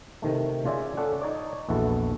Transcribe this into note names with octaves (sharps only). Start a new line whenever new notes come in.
C3 D#3 A3
C#3 F4 D5 E5 G#5
C#4 A4 D5 F#5
D#4 C#5 D5
A#1 E2 E3 F#4 A4